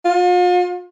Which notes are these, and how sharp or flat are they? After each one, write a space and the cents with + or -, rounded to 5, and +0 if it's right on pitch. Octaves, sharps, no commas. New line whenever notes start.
F4 +40